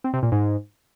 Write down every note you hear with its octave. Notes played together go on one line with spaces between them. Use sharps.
C4
C3
A#2
G#2